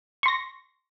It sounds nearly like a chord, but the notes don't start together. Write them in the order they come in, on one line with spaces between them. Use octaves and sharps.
C#6 C6 A#6